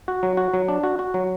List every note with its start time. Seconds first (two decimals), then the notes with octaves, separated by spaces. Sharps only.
0.08 F#4
0.23 F#3
0.37 F#4
0.54 F#3
0.68 D4
0.84 F#4
0.99 F#4
1.14 F#3